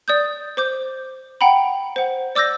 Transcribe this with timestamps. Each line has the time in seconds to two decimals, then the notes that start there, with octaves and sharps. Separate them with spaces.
0.08 D5 D#6 G6
0.57 C5 D6 G6
1.41 F#5 G5 A#5 B5
1.96 C5 F#5
2.35 D5 D6 E6 G6 A#6